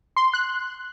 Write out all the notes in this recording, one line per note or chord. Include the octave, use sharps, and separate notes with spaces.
C6
F#6